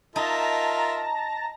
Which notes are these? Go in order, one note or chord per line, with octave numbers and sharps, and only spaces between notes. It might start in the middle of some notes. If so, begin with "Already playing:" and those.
D#4 F4 A#4 E5 A5 A#5 A#6